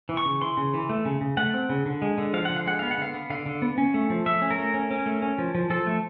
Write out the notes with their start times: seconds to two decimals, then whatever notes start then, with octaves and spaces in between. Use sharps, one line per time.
0.09 E3
0.17 C#6
0.25 C#3
0.41 E3 C6
0.57 C#3
0.74 E3
0.89 A3
1.05 C#3
1.21 C#3
1.37 A3 F#5
1.54 C4
1.69 C#3
1.86 D3
2.02 G#3
2.18 D3
2.33 F3 F5
2.45 D3 F#5
2.56 F5
2.66 G#3 F#5
2.79 B3 F5
2.91 F#5
2.97 D3 F5
3.14 B3
3.30 D3 F5
3.46 D3
3.62 B3
3.78 C#4
3.94 A3
4.10 F3
4.26 A3 E5
4.42 C#4
4.51 A#4
4.58 A3
4.74 C#4
4.91 C#4
5.06 A3
5.22 C#4
5.38 F3
5.55 F3
5.70 F3 A4
5.86 A3